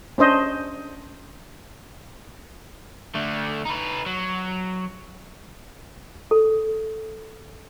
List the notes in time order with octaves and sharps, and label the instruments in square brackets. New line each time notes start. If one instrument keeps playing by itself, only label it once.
[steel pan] C#4 D4 C5 D#5
[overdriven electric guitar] D3 A3
D#4 B4
F#3
[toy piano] A4